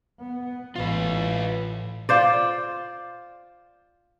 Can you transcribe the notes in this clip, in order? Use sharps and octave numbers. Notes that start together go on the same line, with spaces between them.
B3
A1 A2 F4 B4
F4 C5 D5